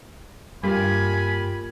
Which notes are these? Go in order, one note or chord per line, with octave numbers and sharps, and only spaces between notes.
G2 A#3 F4 G4 G#5 B5